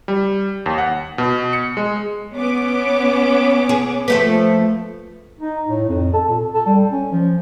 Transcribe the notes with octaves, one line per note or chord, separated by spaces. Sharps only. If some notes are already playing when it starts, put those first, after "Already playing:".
G3
D#2
F#5
B2
C#7
G#3
B3 C#4 D6
G#4
F3 A3 B4
D#4
A2
F2
A4
A#2
A4
G3
C#4
F3